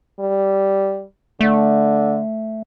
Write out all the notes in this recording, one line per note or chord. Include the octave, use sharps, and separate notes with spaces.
G3
D3 A3